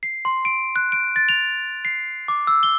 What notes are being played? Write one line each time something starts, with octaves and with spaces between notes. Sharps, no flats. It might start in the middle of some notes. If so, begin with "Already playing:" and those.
C7
C6
D7
F#6
D7
A6
F7
C7
D6
E6
G7